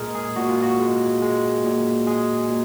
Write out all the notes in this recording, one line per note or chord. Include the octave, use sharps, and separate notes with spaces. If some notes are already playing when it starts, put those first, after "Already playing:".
Already playing: A#2 G#3 G#4 A#4
G#4
A#2 F#4
F4
F#4
G#3
G#3
A#2
G#3 G#4
A#2